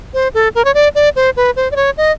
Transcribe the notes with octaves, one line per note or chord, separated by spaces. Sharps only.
C5
A4
A#4
C#5
D5
D5
C5
B4
C5
D5
C#5
D#5